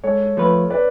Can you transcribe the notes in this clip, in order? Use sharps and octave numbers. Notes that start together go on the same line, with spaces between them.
G#2 A4 C#5
F3 A3 F4 B4
B4 D5